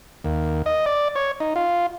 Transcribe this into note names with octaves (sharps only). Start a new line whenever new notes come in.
D#2
D#5
D5
C#5
D#4
F4